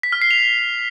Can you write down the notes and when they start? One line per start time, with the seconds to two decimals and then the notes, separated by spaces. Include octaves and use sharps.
0.03 B6
0.12 F6
0.22 C7
0.31 F7